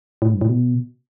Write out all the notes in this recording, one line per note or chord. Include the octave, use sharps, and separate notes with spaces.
A2
G2
A2
B2